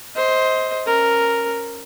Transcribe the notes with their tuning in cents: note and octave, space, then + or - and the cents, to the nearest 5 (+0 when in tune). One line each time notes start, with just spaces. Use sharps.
C5 +0 D#5 +30
C#4 +0 A#4 +0